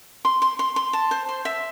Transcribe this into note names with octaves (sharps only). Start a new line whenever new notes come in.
C6
C6
C6
C6
A5
C5
C6
E5